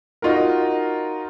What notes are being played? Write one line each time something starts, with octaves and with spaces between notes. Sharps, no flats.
D#4 F4 F#4 A#4